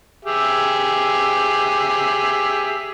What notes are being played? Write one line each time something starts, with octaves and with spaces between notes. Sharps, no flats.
G4 G#4 E5